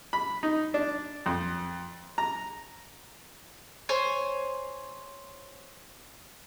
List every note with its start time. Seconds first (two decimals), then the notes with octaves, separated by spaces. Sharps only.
0.13 B5
0.43 D#4
0.74 D4
1.26 F2
2.18 A#5
3.89 C5 C#5 G#5